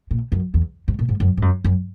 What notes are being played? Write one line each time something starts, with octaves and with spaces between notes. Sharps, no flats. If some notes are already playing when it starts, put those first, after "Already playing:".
A#2
F#2
E2
G#2
A#2
G#2
F#2
G#2
F#2
F#2